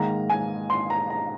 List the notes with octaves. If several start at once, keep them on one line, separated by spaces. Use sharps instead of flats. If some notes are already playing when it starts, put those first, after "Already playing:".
Already playing: G#2 D#3 A#3 A#5
G#5
C6
A#5
A#5